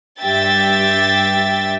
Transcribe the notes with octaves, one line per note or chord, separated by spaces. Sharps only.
G2 G4 E5 G5 A6